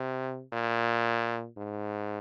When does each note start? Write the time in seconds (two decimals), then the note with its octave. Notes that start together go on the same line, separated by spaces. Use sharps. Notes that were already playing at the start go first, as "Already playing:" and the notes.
Already playing: C3
0.52 A#2
1.57 G#2